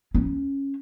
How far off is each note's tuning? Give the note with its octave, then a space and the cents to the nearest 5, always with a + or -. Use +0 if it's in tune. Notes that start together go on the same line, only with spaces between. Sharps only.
C#4 -10